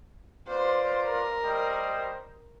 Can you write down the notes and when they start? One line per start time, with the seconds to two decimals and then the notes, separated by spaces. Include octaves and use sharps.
0.48 F4 B4 C5 D5
1.04 A#4
1.44 G3 C5 D#5